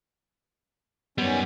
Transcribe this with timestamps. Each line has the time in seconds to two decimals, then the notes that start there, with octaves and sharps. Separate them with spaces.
1.18 F#2 D#3 G3 B3 C#4